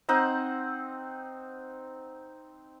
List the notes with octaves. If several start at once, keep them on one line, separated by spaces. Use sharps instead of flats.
C4 D#4 C5 F#5